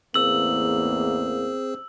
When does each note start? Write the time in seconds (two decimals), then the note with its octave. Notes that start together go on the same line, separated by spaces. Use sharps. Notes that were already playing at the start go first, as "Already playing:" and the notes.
0.14 A1 E2 A#3 C4 G#4 C5 E6 F#7